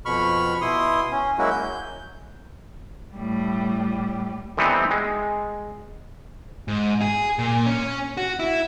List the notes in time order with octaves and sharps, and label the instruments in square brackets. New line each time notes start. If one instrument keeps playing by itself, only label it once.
[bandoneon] F2 B2 B5 C#6 F6
B2 E4 C6 D#6
C#4
F#3 G#3 A#3 C#4 E4 F#4
G6
[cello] A2 G3
[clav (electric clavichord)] D3 E3 G3 B3 C4 D#4
G#3
[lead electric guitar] G#2
G#4
A#2
C#4
F#4
E4